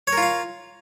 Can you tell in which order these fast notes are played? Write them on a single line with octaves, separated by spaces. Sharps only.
C#5 A#4 F4 F5